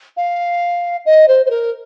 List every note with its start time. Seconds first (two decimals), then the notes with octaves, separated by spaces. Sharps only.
0.17 F5
1.06 D#5
1.28 C5
1.46 C5
1.50 A#4